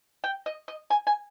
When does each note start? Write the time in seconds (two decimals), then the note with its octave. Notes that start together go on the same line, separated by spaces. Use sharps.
0.24 G5
0.46 D#5
0.68 D#5
0.90 G#5
1.07 G#5